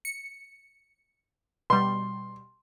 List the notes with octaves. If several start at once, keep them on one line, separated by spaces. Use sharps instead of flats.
C#7
B2 G3 C6